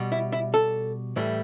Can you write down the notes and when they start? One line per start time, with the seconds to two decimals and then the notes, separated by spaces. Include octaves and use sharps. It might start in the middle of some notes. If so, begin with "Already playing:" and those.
Already playing: B2 G3
0.12 E4
0.32 E4
0.54 A4
1.16 A2 E3 G3